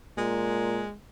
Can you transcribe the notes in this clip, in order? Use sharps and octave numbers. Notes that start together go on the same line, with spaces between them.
A#2 G#3